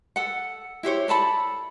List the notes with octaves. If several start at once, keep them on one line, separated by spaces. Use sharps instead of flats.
A4 F#5
E4 G4 C5 C#5
A4 D5 A5 B5